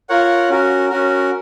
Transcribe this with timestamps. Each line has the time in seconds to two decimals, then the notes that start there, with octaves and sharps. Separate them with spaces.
0.09 F4 A#4 C#5 F#5
0.49 C#4 F#4 A#4
0.90 C#4 F#4 A#4